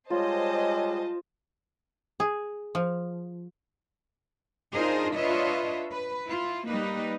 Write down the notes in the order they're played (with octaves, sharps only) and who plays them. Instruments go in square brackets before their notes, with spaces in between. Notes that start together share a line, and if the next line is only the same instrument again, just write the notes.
[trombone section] G3 G#3 [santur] F4 [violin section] C5 D#5 A5 [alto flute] C#5
[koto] G#4
F3
[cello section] D4 D#4 F4 G#4 A#4 C5
D4 F4 B4 C#5 D#5 E5
B4
E4 F4
G3 A#3 D#4 B4